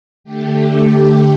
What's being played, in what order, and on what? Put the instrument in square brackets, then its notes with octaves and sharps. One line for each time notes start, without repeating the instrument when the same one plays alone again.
[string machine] D3 A3 G4